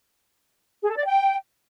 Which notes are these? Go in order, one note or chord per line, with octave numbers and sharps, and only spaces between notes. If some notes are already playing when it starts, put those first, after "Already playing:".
G#4
A4
D5
G5